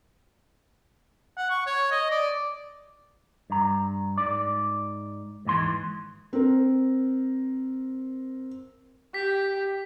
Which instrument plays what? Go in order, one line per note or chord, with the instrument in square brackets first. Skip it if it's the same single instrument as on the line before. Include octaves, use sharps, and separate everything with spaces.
[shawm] F#5
C#6
C#5
D#5
D5
[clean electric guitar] G2 A#5
G#2 D5
D#2 G#2 E3 C6
[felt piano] C4 A#4
[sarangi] G4 [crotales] B6